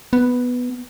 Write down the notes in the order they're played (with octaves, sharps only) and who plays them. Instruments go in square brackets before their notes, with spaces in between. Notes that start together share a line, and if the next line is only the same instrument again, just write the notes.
[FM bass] B3